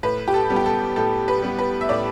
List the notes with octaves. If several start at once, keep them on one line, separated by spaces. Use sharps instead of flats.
A2 B4
G4
A4
G3 B3
G4
A4
A2 A4
B4
G3 B3
B4
E5
A2 D5